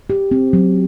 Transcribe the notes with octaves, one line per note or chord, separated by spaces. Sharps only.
G4
C4
F#3